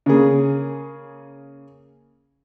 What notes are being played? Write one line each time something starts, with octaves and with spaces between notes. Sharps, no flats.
C#3 A#3 G#4